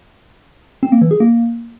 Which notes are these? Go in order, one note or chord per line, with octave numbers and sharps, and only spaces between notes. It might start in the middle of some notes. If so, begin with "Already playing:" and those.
C4
A#3
E3
G#4
A#3